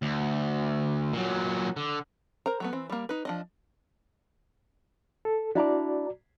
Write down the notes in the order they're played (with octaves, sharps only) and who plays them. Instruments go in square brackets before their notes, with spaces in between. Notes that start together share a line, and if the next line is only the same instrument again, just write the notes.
[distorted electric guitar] D2
A#2 F#3
D3
[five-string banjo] A#4 C5 A#5
F#3 A3 B3
E3 C4
G3 A#3
D#4 B4
F3 D4 D#5
[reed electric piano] A4
[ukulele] D4 E4 A#5 [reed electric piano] F#4 D5